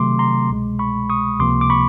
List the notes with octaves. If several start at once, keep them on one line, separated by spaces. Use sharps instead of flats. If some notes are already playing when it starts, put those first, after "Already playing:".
Already playing: C3 D#3 F#3 A3 C6 D6
A#5 C6
C2 B2 G#3
B5 C#6
C#6 D#6
C#2 C3 F3 A#3 C6 D6
D6
B5 C#6